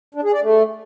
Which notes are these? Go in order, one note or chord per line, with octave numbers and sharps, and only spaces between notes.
D4
G#4
D5
A3